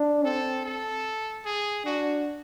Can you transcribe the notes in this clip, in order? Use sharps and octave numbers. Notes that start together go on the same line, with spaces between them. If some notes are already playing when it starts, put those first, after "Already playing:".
Already playing: D4
C4 A4
A4
G#4
D4 F#4